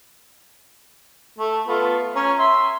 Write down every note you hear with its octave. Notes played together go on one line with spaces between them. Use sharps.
A3
A3 B3 F4
C#4 A#5
E5 C6